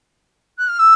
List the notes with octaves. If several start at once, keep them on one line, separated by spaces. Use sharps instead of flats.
F#6
F6
E6